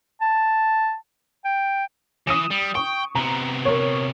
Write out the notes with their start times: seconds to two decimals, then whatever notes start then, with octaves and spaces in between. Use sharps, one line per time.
0.21 A5
1.45 G5
2.27 E3 D#6 D#7 E7
2.51 G3
2.75 G5 C#6
3.15 C3 B3 A#5
3.65 A#4 C#5